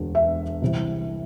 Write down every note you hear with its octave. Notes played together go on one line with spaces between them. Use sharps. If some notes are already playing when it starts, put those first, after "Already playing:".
Already playing: E1 D2 D3
E5
C2 C3 E3